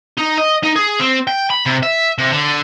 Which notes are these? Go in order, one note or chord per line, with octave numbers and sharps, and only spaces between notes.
D#4
D#5
D#4
G#4
C4
G5
B5
C3
E5
C3
D3